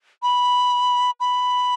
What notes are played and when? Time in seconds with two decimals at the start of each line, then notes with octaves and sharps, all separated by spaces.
0.22 B5
1.20 B5